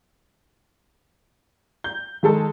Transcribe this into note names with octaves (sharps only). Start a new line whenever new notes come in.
G6
D#3 G#3 A4 A5